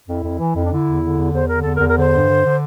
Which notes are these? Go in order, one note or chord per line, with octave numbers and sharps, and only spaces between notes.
F2 E4
F2
E3
F2
D4
D3 E4
E2
D3
E2
E2 C5
D3 A#4
E2 A4
A#4
E2
A#4
D3 C5
G2
D3
D3